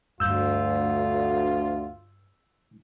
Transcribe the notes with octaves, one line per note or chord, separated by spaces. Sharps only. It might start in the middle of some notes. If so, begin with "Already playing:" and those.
D2 G2 F4 E6 G6